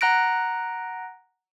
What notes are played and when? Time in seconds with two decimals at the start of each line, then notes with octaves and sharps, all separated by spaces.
0.01 F#5 A#5 F#6 A#6 D7